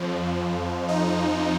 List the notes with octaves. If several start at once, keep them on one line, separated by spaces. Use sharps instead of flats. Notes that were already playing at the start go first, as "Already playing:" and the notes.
Already playing: F2 F3
D#4